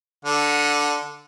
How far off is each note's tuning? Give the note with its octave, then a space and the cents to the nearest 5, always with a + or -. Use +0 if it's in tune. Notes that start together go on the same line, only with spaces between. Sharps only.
D3 +0 F#5 -30